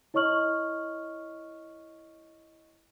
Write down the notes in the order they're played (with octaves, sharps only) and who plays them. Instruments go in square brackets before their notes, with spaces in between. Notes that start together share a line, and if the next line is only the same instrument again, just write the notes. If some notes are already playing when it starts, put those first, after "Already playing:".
[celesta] E4 C#5 D#5 C#6 F6 F#7